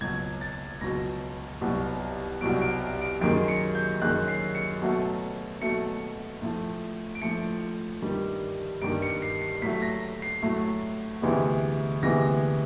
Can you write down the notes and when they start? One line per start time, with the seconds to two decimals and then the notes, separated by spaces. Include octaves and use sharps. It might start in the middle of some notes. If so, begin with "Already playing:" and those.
0.01 C#2 B2 F#3 G#6
0.41 A6
0.81 C#2 B2 F#3 A#6
1.61 C2 B2 F#3
2.41 C2 B2 F#3 D7
2.62 D7
3.01 D7
3.21 F#2 D#3 G#3 D7
3.48 C#7
3.75 G6
4.02 F#2 D#3 G#3 F#6
4.28 C7
4.55 C#7
4.82 B2 F#3 A3
5.61 B2 F#3 A3 C#7
6.42 A2 F3 A3
7.15 D7
7.22 A2 F3 A3 C#7
8.02 G2 D#3 G3
8.82 G2 D#3 G3 D7
9.02 C#7
9.22 C7
9.42 C7
9.62 A2 F#3 A3 B6
9.82 A#6
10.22 C7
10.42 A2 F#3 A3
11.22 D2 C3 E3 G#3 B3
12.02 D2 C3 E3 G#3 B3 A#6